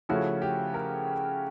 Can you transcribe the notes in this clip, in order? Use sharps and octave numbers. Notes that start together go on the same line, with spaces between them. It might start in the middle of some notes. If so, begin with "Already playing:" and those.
C#3 F3 A3 C#4 E4 F#4
G4
A#4